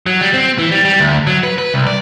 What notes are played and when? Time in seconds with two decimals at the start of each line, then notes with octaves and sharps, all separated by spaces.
0.06 F#3
0.21 G3
0.34 C4
0.58 E3
0.71 G3
0.85 G3
1.00 D2
1.27 F#3
1.43 B4
1.58 B4
1.74 C2
1.87 D5